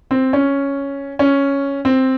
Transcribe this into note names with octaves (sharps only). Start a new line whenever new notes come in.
C4
C#4
C#4
C4